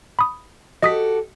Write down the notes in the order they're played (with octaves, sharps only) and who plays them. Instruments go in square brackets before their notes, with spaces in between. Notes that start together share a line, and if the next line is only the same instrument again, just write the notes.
[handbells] B5 D#6
[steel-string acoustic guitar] F#4 G4 A4 [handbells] D#5 D#6 B6